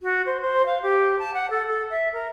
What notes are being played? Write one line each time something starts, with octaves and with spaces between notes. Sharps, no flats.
F#4
C5
C5
F5
G4
A5
F#5
A4
A4
E5
A#4